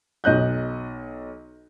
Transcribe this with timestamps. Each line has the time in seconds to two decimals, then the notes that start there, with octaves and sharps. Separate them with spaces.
0.24 B1 D#5 F#6 G6